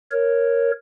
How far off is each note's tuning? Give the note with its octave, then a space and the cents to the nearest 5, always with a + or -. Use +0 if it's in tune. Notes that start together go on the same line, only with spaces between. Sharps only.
A#4 +0 C#5 -5